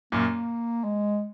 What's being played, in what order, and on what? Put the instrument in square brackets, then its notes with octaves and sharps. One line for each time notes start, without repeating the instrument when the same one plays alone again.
[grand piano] F#2 A#2 [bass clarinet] A#3
[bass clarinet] G#3